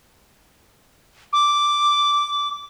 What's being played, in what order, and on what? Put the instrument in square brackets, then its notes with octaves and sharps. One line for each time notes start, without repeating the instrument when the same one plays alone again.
[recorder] D6